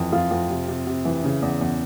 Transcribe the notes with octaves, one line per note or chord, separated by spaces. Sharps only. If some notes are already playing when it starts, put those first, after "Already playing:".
Already playing: F2 E3
F2 F4
F2
C3
C3
C3
E3
C#3
E2
E2